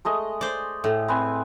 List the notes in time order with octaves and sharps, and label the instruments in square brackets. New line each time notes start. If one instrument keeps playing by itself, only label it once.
[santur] G#3 A3 D#5
[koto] C5 D5
A2
[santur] C4 B4 G#5